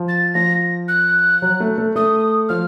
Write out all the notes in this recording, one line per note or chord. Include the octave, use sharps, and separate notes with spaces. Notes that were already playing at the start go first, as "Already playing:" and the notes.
Already playing: F3
A6
F3 A#6
F#6
F#3
A3
A3
A3 D#6
F3 F6